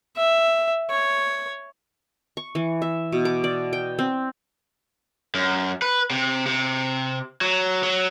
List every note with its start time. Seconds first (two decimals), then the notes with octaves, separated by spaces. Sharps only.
0.16 E5
0.90 C#5
2.37 C#6
2.55 E3
2.82 E5
3.12 B2
3.25 D6
3.44 D5
3.73 G5
3.99 C4
5.35 F#2
5.82 B4
6.10 C3
6.46 C3
7.41 F#3
7.83 F#3